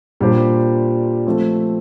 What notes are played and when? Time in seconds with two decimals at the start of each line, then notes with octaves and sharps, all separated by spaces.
0.20 A#2 G3 D4 G4 C5
1.27 F3 A3 C4